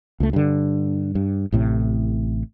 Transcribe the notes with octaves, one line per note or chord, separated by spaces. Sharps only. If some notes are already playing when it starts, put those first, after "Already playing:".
C#2 A3
G2 D3
G2
A1 A2 C3